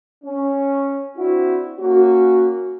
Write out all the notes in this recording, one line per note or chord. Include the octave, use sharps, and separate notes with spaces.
C#4
C4 D4 E4 F#4
A#3 C#4 F#4